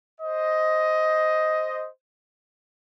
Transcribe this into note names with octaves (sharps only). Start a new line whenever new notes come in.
C5 D#5